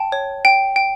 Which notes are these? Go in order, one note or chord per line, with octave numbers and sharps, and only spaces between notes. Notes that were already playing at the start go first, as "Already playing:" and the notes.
Already playing: G5 A5
C#5
G5
G5